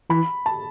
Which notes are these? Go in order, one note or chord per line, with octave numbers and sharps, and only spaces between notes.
E3 B5
A5